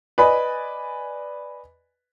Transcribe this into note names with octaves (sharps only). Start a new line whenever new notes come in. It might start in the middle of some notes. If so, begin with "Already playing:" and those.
B4 D5 D#5 G#5 B5